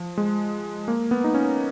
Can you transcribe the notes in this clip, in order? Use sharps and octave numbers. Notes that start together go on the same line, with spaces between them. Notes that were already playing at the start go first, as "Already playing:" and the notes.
Already playing: F3
G#3
A#3
B3
D#4
C#4